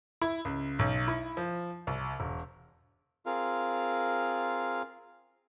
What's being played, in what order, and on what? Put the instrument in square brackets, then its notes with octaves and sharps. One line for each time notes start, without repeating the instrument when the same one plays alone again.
[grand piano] E4
C#2
B1
E4
F3
C2
E1
[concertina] C4 F4 G#4 A#4 F5